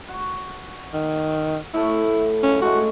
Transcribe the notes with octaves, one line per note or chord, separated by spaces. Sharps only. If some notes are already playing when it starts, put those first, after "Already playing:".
F#4
D#3
A2 A3 E4
C#3 C#4
G#3 A3 C#4 F#4